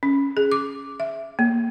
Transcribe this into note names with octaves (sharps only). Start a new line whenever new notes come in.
C#4
G#4
D6
E5
A#3